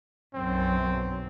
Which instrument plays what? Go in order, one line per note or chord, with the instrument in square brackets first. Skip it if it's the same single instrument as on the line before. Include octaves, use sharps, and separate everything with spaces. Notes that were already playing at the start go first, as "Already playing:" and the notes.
[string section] B1 F#2 [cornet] C4